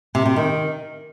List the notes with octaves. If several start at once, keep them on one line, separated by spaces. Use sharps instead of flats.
C3
C3
D#3